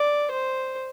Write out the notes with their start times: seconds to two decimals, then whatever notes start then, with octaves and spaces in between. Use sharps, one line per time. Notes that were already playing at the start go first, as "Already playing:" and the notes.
Already playing: D5
0.31 C5